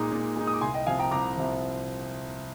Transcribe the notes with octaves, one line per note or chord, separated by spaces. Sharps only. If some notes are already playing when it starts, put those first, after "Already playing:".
Already playing: A#2 G#3 D#4 A#5 D6
A#2
G#3 D#4
D#6
D6
C2 G#5 C6
D#5 G5
C3 F3 F5 G#5
G5 A#5
C2 A#5 D6
C3 F3